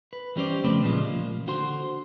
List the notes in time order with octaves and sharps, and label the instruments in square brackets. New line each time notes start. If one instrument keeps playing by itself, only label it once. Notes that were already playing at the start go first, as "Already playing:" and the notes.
[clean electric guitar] B4
E3 G3 C#4 C5 D5
F2 C#3 A3 C4 B4 D5
A#2 C#3 E3 F3 G#3
A#3
D3 F#4 C5 C6